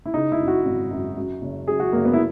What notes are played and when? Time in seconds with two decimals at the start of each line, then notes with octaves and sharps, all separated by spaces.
0.06 E4
0.14 C#3 D#4
0.32 E4
0.40 F#2
0.48 F#4
0.65 G#1
0.91 F#2
1.17 F#2
1.42 F#1
1.67 F#2 G#4
1.80 F#4
1.93 F#1 A#3
2.05 B3
2.13 E4